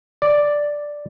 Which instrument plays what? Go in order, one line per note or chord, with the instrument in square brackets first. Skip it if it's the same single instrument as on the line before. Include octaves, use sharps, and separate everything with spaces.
[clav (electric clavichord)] D5